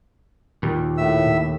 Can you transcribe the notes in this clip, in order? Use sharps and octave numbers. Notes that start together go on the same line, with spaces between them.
D#2 A#2
A2 E5 E6